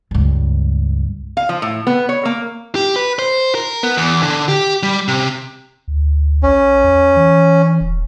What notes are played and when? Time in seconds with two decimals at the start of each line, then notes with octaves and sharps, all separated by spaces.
0.11 C#2 G2
1.37 F5
1.49 F3
1.62 A2
1.87 B3
2.09 C#5
2.25 A#3
2.75 G4
2.96 B4
3.19 C5
3.55 A#4
3.83 B3
3.97 E2
4.23 D3
4.49 G4
4.83 G3
5.08 C3
5.88 D2
6.43 A#1 C#4
6.84 E2
7.16 E3
7.81 D#1